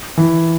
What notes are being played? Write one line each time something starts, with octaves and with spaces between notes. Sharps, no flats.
E3